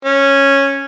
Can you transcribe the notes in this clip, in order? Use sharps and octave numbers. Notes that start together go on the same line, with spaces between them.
C#4